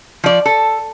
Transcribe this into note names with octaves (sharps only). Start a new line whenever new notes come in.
F3 D5
A4